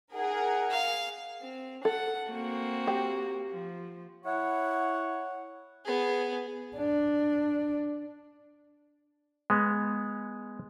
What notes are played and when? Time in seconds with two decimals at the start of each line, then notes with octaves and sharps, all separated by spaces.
0.14 D#4 G#4 A#4 F#5
0.70 F5
1.41 C4
1.85 A4 F#5
2.30 A#3 C4 F#4
2.87 G4
3.50 F3
4.25 E4 C#5 F#5
5.85 B3 G#4
6.77 D4
9.50 G#3 B3